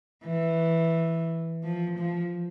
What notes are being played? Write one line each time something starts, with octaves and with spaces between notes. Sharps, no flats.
E3
F3
F3